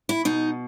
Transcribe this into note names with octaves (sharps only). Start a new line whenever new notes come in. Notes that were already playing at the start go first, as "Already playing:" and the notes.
E4
B2 D#4